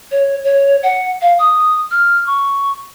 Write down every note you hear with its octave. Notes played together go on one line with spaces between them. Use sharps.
C#5
C#5
F#5
F5
D#6
F6
C#6